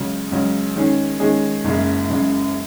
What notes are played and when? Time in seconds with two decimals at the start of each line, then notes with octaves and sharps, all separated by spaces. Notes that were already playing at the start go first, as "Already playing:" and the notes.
Already playing: C#2 C#3 F#3
0.31 C#2 C#3 F#3
0.75 D#3 G#3 C#4 G#4
1.20 D#3 G#3 C#4 G#4
1.64 F#1 F#2 C#3 G#3
2.09 F#1 F#2 C#3 G#3